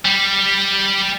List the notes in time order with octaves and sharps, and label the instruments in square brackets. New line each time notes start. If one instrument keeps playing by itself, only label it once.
[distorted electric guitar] G3